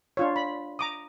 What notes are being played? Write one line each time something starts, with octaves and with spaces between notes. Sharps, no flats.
D4 F4 C#5
B5
A#5 D6 D#6